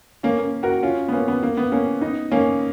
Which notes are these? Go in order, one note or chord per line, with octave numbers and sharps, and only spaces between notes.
A#3 C#4
A#3
F#4 A#4
C#4 F4
B3
A#3 C#4
B3
A#3
B3
A#3 C#4
B3 D#4
A#3 C#4